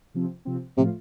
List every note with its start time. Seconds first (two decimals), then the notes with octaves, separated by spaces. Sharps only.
0.14 C3 F3 C4
0.45 C3 F3 C4
0.77 A2 C3 F3 A3 F4